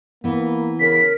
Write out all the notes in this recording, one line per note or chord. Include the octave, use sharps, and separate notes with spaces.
E3 A#3 B3
C#3 A#4 B6